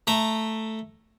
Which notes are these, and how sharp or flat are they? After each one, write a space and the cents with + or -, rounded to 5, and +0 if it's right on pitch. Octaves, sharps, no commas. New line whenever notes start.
A3 +0 A#5 +0